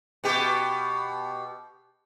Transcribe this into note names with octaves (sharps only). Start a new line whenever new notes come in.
B2 G4